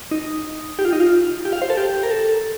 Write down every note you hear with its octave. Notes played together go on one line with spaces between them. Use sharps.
D#4
G4
F4
D#4
F4
G4
F5
C5
A4
G4
A#4
A4